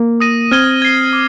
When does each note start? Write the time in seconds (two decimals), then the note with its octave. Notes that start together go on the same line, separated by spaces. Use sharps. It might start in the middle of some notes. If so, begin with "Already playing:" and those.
Already playing: A#3
0.20 D#6 A#6 D#7
0.52 C4 F6 G#6 D#7 G7
0.82 G#6 C7 G7
1.13 D6